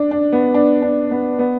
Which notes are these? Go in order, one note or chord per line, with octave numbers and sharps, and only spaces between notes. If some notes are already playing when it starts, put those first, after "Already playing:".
Already playing: D4
D4
B3
D4
D4
B3
B3